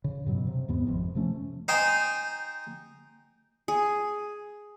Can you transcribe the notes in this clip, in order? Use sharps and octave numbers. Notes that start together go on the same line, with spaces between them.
C#3
G2 B2 F#3
C3
D#2 G#2 C3 B3
G#1 F2
C3 F3 A3 C#4
D#4 C5 D#5 G5 G#5
G#4